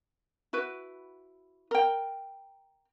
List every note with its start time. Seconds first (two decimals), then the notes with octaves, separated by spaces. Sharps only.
0.53 E4 F#4 B4
1.71 A#4 G5